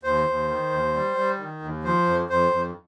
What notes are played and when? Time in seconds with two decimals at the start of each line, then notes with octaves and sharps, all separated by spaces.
0.03 D#2 C5
0.27 D#2
0.48 D#3
0.71 D#2
0.94 G3
1.17 G3
1.39 D#3
1.62 D#2
1.84 F3 C5
2.06 F2
2.30 F2 C5
2.51 F2